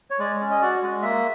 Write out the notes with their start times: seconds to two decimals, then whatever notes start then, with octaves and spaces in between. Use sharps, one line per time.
0.10 C#5
0.19 G#3 D5
0.41 C#4
0.51 D#5
0.62 F#4 D5
0.82 G#3
1.02 A#3 E5